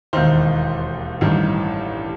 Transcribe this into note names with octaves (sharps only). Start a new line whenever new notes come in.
E1 D#2 D#3 C5
A1 G2 D#3